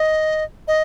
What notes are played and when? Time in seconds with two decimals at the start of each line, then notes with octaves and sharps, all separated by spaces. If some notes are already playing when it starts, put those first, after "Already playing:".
Already playing: D#5
0.68 D#5